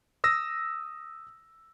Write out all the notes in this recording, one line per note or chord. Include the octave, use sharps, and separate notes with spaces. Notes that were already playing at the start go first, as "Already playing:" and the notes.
D#6 E6 A#6